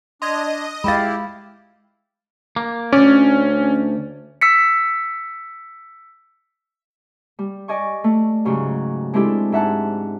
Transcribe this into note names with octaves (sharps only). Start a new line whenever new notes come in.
D4 D#5 C6 G#6
G#3 E4 G4 F5 B5 A6
A#3
D2 C#4 D5
E6 B6 C#7
G3
D5 D#5 G#5 C#6
A3
G#2 C#3 F#3 G4
G#3 C4 D4 E4 G4 A4
G#2 E5 F#5 A5